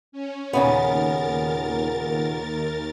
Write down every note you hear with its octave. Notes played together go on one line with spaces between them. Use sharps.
C#4
D#2 A#2 C#3 B3 A#4 A6